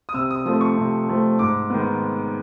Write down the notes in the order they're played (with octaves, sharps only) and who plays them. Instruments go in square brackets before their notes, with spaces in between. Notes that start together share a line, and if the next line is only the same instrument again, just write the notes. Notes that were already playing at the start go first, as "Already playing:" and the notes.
[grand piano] D#6
C3 E6
D#6
F3 A3 C4 D#6
C#6
C3
F3 A3 C4
G#2 D6
D#3 G#3 B3